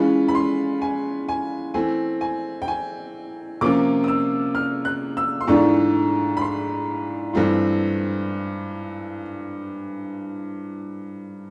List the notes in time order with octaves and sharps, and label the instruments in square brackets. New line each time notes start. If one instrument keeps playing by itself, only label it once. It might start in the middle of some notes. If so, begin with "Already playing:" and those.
Already playing: [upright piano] E3 G#3 C#4 F4 B5
B5
C6
G#5
G#5
E3 A3 C4 G#5
G#5
G5
G#5
C3 F3 A#3 C#4 F4 D6
D#6
E6
F6
F#6
E6
C6
G#2 E3 A3 D4 F4 C#6
B5
C6
G2 E3 A3 C4 F4